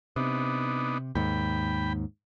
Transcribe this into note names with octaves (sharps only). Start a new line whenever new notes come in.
C3 B3 D4 D#4
D#2 G#2 G5 B5